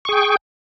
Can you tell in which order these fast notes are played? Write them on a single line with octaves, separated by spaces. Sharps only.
C#6 G#4 G5